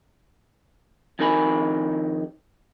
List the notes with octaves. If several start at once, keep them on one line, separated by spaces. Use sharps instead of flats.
F2 D#3 D#4 A#4 G#5 B5